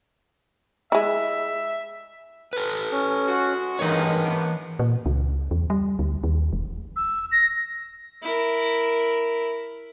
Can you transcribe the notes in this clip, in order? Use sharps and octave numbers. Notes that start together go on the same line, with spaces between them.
G#3 E4 E5
A4 B4
C#4
G#3 F#4
G2 D#3 E3 G#3 A#3 B3 D#4 C#5
A#3 B3
A#2
C#2
E2
G3
D2
D#2
E1
E6
A#6
E4 A#4